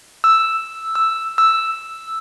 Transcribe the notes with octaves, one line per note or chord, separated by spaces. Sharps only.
E6
E6
E6